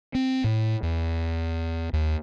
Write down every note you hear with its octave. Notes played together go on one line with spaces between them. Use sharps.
C4
A2
E2
D#2